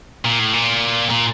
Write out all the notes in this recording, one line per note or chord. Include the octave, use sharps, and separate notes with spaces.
A#2
A2
A#2
A#2